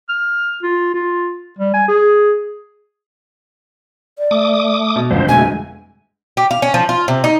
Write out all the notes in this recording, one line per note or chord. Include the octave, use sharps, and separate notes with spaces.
F6
F4
F4
G3
G#5
G#4
D5
A3 D6 D#6
B2
G1 F2 C#4 C5
B2 G#3 A3 G#5
G4
F5
C#4
F3
F4
C3
D#4